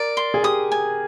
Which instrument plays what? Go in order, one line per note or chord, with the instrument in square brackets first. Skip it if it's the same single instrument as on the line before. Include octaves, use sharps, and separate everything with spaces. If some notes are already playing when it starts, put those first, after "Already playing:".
Already playing: [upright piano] A#4 [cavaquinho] D5
[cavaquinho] C6
[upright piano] G#4
[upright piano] G4 [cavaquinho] D#6
[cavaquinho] G#5